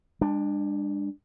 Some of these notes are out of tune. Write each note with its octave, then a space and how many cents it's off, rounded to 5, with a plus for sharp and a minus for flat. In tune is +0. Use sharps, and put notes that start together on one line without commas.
G#3 -45 D4 +10